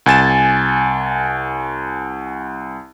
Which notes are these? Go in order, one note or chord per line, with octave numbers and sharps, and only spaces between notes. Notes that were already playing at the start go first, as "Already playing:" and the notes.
C2 G#5 A6 E7